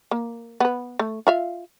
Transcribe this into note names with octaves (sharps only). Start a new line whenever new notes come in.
A#3
B3 B4
A3
F4 E5 F5